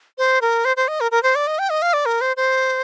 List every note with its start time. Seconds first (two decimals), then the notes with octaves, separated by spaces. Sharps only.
0.18 C5
0.42 A#4
0.65 C5
0.77 C5
0.88 D#5
1.01 A#4
1.11 A#4
1.23 C5
1.35 D5
1.47 D#5
1.59 G5
1.70 D#5
1.82 F5
1.93 D5
2.06 A#4
2.21 C5
2.37 C5